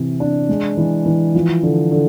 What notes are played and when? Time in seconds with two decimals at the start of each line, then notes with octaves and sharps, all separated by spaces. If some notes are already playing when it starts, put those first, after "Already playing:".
Already playing: C3 E3
0.20 D4
0.49 G#3
0.77 E3
1.06 E3
1.35 F3
1.63 D3
1.91 D3